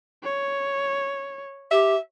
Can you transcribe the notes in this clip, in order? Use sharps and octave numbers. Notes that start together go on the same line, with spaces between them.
C#5
G4 E5